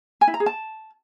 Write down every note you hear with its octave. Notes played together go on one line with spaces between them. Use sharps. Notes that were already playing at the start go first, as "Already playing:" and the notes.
G#5
E4
A#5
G#4
A5